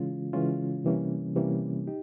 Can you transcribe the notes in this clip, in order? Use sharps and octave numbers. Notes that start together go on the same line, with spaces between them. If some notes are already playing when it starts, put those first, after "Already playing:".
Already playing: C#3 E3 G#3 C#4 F4
C#3 E3 G#3 C#4 F4
C3 E3 G3 A#3 C#4
C3 E3 G3 A#3 C#4
D#4 G4